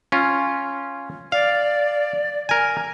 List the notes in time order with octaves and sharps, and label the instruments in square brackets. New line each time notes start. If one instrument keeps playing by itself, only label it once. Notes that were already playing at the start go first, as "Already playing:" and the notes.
[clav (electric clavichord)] C#4 F4
[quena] D5 [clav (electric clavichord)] F5
[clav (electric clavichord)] A#4 G#5